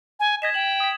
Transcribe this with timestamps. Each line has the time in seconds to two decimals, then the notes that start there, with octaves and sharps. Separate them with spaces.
0.20 G#5
0.42 D#5 G#6 B6 E7
0.54 G5 E7 F#7
0.80 D#6 B6